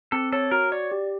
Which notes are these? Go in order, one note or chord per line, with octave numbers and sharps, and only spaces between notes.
C4 A4
A4 C#5
F#4 A#4
C#5 D5
G4